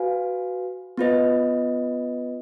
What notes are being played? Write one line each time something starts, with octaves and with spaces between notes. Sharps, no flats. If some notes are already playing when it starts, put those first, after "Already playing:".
Already playing: F#4 B4 F5 G#5
B3 F4 B4 D#5